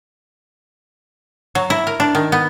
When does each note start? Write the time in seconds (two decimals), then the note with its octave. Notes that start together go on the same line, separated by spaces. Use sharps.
1.55 F#3
1.70 E4
1.87 A#4
2.00 D4
2.15 D#3
2.32 B3